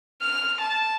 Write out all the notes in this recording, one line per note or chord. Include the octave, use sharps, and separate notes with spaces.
F6
A5